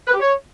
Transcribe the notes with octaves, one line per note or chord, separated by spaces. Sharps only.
B4
G4
C#5